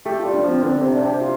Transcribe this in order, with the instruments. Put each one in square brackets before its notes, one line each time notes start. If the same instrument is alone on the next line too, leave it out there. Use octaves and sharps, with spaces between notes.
[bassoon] A3 [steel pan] G4
[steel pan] F4
[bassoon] G3
[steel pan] D4
[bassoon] F3 [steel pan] C4
[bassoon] D3 [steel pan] C4
[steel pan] C4
[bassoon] C3
[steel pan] D4
[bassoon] C3 [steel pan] G4
[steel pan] F4